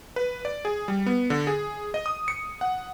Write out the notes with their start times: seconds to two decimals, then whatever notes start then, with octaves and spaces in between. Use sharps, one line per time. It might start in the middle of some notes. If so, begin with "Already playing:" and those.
0.16 B4
0.45 D5
0.65 G#4
0.88 G3
1.06 B3
1.30 D3
1.47 G#4
1.94 D#5
2.06 D#6
2.28 C#7
2.61 F#5